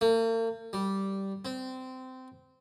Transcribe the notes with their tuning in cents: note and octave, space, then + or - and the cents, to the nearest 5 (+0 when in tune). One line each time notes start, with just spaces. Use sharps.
A#3 -45
G3 -10
C4 -20